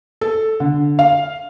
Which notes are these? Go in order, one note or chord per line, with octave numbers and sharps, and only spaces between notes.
A4
D3
F5